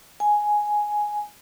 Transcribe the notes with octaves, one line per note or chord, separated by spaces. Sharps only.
G#5